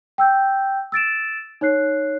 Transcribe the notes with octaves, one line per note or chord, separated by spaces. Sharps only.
G5 E6 G6
E6 A6 D7 E7
D#4 C#5 F#6 C7